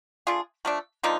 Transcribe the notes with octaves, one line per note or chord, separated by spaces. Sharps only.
A3 D4 F4 G#4
F3 A3 D4
D3 F3 A#3 D#4